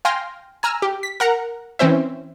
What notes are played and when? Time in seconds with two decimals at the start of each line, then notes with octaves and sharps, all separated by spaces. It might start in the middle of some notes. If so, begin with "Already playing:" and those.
0.05 F5 G5 G#5 C6 F6 A#6
0.63 G#5 A#5 E6 F6
0.82 G4
1.03 B6
1.20 A#4 F#5 A#5
1.79 E3 C4 C#4 C5 E5